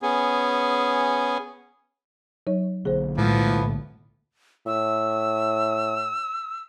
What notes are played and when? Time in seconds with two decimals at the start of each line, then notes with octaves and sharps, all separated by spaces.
0.02 B3 C#4 G#4
2.47 F#3 D#4 C#5
2.85 B1 D3 A#3 G#4 C5
3.18 A2 E3 F3 G#3 B3
4.67 A2 E6